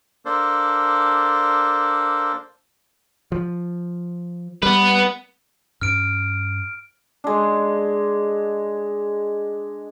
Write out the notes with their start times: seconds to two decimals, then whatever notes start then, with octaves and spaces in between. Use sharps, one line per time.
0.25 A#3 D4 A4 C5
3.32 F3
4.63 G3 B3 B4
5.81 G2 C#4 F6 D7
7.24 G#3 D4